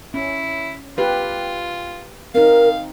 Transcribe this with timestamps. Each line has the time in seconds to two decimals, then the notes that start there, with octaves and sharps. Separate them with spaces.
0.14 C#4 E4
0.98 F4 G4 B4
2.35 C4 D#4 A#4 F5